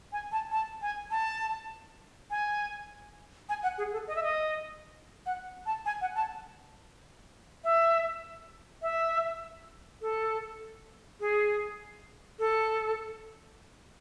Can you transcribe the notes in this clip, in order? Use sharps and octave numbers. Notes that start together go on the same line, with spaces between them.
G#5
A5
A5
G#5
A5
G#5
G#5
F#5
G#4
A4
D#5
E5
D#5
F#5
A5
G#5
F#5
A5
E5
E5
A4
G#4
A4